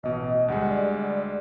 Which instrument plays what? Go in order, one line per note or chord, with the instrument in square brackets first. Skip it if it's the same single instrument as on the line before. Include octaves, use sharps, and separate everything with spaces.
[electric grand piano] A1 B2 [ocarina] D#5
[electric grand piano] D2 G3 G#3 [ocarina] F#5
[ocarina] D5